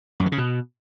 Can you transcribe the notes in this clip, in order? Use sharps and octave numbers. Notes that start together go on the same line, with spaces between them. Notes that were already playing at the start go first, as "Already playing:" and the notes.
F#2
E3
C#3
B2